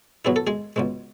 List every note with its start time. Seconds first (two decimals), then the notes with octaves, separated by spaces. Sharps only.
0.25 B2 F#3 B3 E4 G#4
0.36 A4
0.47 G#3 G#4
0.76 C#2 B2 G#3